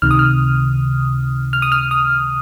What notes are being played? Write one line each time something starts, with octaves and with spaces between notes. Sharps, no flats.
C#2 C3 D#3 F6
D#6
F6
F6
D#6
F6
D#6